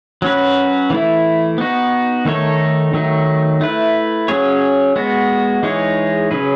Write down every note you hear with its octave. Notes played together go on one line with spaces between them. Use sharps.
F#3 C#4 F#4 B4
E3 A3 E4
B3 D#4 F#4
D#3 A3 D#4 A4 C#5
D#3 F#3 A3 D#4
A3 E4 B4
F#3 C#4 G#4 C#5
G#3 B3 F#4
E3 G#3 D#4 G#4 C#5
C#3 F#3 C#4 G#4 B4